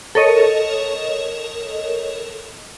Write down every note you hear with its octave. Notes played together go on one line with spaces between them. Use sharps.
A4 A#4 C#5 D#5